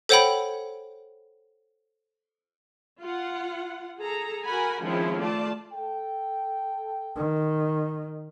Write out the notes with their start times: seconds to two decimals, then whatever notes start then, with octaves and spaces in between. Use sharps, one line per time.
0.09 A4 C5 C#5 F#5 G5 B5
3.02 F4 F#5
3.98 G#4 A4 A#5
4.44 F#4 A#4 F#5 G#5 B5
4.81 D#3 F3 G#3 C4 C#4 E4
5.19 A3 F4 D5 A5
5.72 A4 G5
7.16 D#3